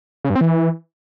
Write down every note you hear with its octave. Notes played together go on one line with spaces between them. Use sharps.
C#3
G2
C4
E3